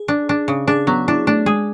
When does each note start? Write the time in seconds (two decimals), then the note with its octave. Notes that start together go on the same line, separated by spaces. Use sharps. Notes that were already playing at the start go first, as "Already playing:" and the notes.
Already playing: G#4
0.08 D4
0.29 D4
0.48 C#3
0.68 D4 G#4
0.87 F#3 B3
1.08 D4 E4
1.27 A3 D4
1.46 G#3 G#4